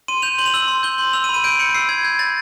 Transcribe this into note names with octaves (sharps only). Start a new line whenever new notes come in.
C6 D#7
G6 F7
C6 F#7
F7
E6 F#7
C6
G6 G7
C6 F#7
E6 F7
D#7
B5
D#7
G6 D7
B5 C#7
E6 C7
B5 G#6
G6 G#6
B5 A6